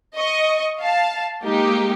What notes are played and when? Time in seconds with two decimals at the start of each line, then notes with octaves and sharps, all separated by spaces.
0.17 D#5 C#6
0.82 F5 A5
1.44 G#3 A#3 D#4 G4